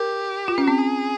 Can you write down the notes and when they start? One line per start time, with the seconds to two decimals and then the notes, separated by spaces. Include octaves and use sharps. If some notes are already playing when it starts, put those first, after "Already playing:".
Already playing: G4 A#4
0.48 F4
0.58 C#4
0.68 C4
0.78 G#4